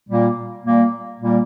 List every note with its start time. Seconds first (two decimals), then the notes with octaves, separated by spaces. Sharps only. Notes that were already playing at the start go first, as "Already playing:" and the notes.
0.08 A#2 G3 A#3
0.64 A#2 G3 A#3
1.20 A#2 G3 A#3